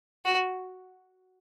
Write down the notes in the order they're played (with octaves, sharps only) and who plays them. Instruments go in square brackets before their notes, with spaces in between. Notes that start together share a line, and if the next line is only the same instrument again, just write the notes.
[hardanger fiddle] F#4